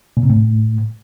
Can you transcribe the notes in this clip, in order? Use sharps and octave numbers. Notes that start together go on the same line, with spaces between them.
A#2
C3
A2